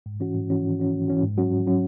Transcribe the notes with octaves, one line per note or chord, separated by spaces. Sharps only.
G#2
E3 C#4 F#4
G#2
E3 C#4 F#4
G#2
E3 C#4 F#4
G#2
E3 C#4 F#4
G#2
F#3 C#4 F#4
G#2
F#3 C#4 F#4